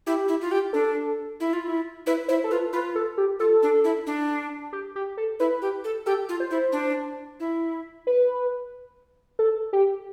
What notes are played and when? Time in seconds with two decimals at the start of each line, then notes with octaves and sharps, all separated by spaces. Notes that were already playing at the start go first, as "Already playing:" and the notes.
0.07 E4 G4
0.28 E4
0.41 F4
0.52 G4
0.73 D4 A4
1.40 E4
1.53 F4
1.68 E4
2.06 E4 B4
2.28 E4 C5
2.44 A4
2.51 F4 B4
2.73 F4 B4
2.96 A4
3.18 G4
3.40 F4 A4
3.63 D4
3.84 E4
4.07 D4
4.73 G4
4.96 G4
5.17 A4
5.40 E4 B4
5.62 G4
5.84 A4
6.06 G4 A4
6.29 F4
6.40 C5
6.51 E4
6.72 D4
7.40 E4
8.07 B4
9.39 A4
9.73 G4